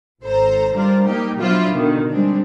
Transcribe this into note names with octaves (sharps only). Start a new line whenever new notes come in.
G#1 A4 C5 A#5
G3 D4 F4 A#4 C5
G3 A#3 D#4 G4
B2 F3 F#3 D4 E4 F4
B2 D3 D#3
G3 G#3 C4 D4